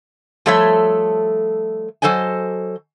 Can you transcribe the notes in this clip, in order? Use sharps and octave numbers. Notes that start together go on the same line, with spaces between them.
F3 G3 A3 A4 C#5 E5
F#3 A4 C5 D#5 G#5